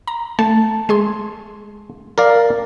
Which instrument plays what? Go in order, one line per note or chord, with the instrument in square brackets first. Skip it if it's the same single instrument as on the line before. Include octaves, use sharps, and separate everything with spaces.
[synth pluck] A#5
[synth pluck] A3 [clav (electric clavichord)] A5
[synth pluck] G#3 G#4 C6
[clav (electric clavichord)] A#4 D5 F5